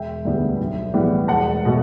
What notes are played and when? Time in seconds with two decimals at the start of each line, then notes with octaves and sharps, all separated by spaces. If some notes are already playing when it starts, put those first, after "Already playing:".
Already playing: E1 E5 G5
0.25 D2 D3 G3 B3
0.59 B1
0.94 A2 E3 G3 B3
1.28 E1 F#5 A5
1.65 B2 A3